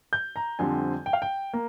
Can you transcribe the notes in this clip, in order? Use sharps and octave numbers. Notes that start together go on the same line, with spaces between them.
G6
A#5
F2 D3 G3 C4 G#5
G5
F5
G5
A#3